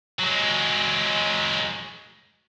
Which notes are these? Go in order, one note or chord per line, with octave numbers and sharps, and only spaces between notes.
F#3 G#3